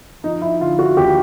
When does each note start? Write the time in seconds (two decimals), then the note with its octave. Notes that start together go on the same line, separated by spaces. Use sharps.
0.24 F3 D#4
0.42 E4
0.60 D3 F4
0.79 F#4
0.97 D#2 G4